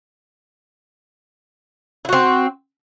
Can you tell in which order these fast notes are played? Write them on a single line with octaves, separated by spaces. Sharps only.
E4 F#4 C4